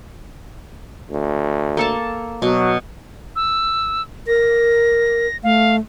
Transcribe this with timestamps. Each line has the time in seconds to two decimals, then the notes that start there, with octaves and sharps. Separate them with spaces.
1.11 D2
1.77 A#3 A4 A5
2.42 B2 F#3
3.36 E6
4.27 A#4 A#6
5.44 A3 F5